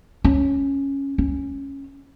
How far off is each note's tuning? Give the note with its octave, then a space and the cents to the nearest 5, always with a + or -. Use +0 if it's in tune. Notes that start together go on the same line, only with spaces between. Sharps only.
C#4 -5
C#4 -10